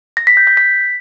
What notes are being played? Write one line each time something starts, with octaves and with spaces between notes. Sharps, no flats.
A#6
B6
G6
G6
B6